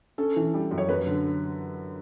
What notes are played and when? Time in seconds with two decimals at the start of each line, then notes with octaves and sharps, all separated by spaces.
0.18 C#4 A4
0.36 E3
0.54 G3
0.71 F#2
0.78 C#5
0.89 F#2 B4
1.07 D3